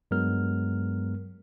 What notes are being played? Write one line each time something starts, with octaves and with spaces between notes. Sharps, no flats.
G2 F#3 G#3 B3 A#4 F6